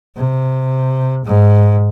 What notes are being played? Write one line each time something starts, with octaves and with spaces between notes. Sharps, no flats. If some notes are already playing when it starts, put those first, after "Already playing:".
C3
G#2